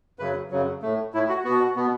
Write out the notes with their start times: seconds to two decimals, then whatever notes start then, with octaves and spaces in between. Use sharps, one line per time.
0.19 F#2 C#3 F#3 B4
0.51 F#2 C#3 F#3
0.82 A2 A3
1.14 A2 A3 E4
1.29 F#4
1.44 B3 F#4
1.49 B2
1.76 B2 B3